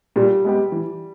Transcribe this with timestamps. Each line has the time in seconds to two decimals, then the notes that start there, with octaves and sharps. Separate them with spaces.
0.16 A#2 G3
0.45 G#3 B3 G4
0.72 E3